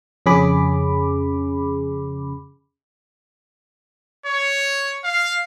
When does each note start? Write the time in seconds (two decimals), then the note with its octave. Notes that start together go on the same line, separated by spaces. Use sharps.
0.26 F2 C#3 C#4 G#4 B5 D6
4.26 C#5
5.04 F5